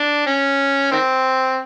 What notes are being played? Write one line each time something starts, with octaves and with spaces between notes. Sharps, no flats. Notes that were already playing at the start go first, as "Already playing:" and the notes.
Already playing: D4
C#4
D#3 C4